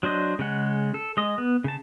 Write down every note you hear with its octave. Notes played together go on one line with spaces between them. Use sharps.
F#3 D4 C5 D#5
C#3 G#3 F#5
A4
G#3 D#5
B3
C#3 A5